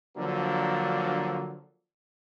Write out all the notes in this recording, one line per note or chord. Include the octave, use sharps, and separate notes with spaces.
D3 F3 F#3 A#3 D4